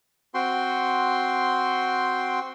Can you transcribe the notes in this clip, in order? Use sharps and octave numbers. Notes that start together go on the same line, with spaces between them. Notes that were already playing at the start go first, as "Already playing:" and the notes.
C4 F#4 G5 C6